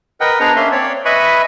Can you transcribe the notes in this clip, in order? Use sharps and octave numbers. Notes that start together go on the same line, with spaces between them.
A#4 B4 D#5 F#5 G5
B3 D4 G#4 C5 A#5
A#3 C#4 E5 C6
C4 C#5 D5
B4 D#5 E5 G#5 B5 C#6